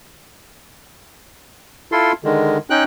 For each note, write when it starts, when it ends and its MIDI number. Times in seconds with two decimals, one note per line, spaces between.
1.92 2.12 64
1.92 2.12 65
1.92 2.12 69
1.92 2.12 84
2.24 2.58 50
2.24 2.58 51
2.24 2.58 56
2.70 2.84 61
2.70 2.84 63
2.70 2.84 79
2.70 2.84 90